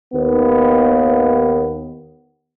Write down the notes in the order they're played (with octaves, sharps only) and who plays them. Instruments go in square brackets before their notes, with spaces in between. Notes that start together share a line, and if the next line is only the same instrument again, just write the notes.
[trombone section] D#2 B3